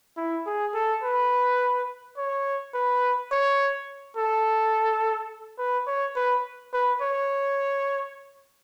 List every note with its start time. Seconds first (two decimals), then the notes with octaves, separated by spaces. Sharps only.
0.17 E4
0.46 G#4
0.74 A4
1.03 B4
2.17 C#5
2.74 B4
3.31 C#5
4.17 A4
5.58 B4
5.87 C#5
6.16 B4
6.73 B4
7.01 C#5